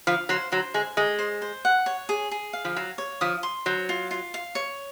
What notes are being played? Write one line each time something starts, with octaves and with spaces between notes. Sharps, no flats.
F3 F5
F#3 C5
F#3 C5
G#3 G#5
G#3 D#5
C5
C5
F#5
C#5
G#4
G#4
F5
F3
F#3 F5
C#5
F3 D#6
C6
F#3 C5
F4
F4
F5
C#5